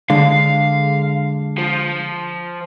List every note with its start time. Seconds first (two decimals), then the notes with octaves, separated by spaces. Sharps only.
0.10 D3 G#3 F5
1.58 F3